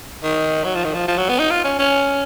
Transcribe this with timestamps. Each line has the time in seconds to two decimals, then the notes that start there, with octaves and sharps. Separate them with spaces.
0.23 D#3
0.65 F#3
0.75 F3
0.84 D#3
0.94 F3
1.08 F3
1.18 F#3
1.29 B3
1.39 D#4
1.51 F4
1.64 C#4
1.79 C#4